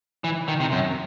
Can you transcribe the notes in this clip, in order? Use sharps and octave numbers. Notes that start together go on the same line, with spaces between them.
E3
D#3
C3
F#2